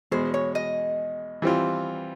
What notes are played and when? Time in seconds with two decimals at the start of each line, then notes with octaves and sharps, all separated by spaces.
0.12 E2 B2 G#3 C5
0.34 C#5
0.55 D#5
1.42 E3 G3 C4 F4